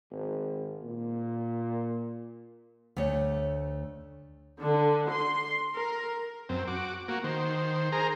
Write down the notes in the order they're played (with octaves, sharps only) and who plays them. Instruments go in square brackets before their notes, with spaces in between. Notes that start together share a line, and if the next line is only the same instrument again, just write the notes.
[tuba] G#1
A#2
[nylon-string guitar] D2 A3 C#5
[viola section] D3
C6
A#4
[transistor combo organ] F#2 C4
F#4 D6
A#3 F#4
D#3 C5
G#4 A#4 C5 A#5